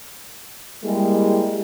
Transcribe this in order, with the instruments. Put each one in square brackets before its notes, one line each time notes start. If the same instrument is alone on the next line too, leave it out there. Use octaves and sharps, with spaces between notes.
[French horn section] G3 G#3 A#3 E4 G4 G#4